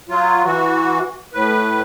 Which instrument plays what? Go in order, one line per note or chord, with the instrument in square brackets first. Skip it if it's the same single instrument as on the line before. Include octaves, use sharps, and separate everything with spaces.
[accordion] F#3 F4
E3 F#4
A2 B4